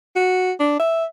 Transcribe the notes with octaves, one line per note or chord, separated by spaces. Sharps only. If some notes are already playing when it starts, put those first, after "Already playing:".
F#4
D4
E5